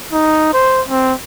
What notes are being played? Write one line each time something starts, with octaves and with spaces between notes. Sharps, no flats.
D#4
C5
C4